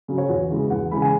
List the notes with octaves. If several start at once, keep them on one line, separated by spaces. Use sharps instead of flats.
C#3 F#3
C#5
E2 F#4
C#3 E3 G#3
E2 F#5
C#3 E3 G#3 B5
G#5